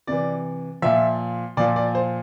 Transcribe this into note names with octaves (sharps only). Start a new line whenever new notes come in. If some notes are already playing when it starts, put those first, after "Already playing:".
C3 E3 D5
A#2 F3 E5
A#2 F3 D5
D5
C5